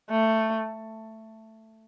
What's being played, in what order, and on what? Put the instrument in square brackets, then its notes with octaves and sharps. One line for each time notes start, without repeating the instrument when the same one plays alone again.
[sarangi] A3